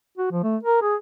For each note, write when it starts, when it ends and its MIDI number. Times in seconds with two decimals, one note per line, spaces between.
0.18 0.29 66
0.31 0.43 53
0.43 0.57 57
0.63 0.81 70
0.82 0.95 68